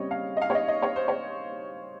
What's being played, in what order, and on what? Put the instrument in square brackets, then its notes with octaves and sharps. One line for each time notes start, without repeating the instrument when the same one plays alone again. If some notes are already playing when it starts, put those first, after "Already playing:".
Already playing: [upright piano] C#3 G3 C4 C#5 D#5
F5
D#5
F5
C#5
D#5
D#5
C#5
C5
C#5